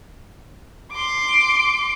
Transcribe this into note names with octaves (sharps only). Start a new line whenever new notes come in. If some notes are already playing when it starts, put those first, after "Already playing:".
C6 D6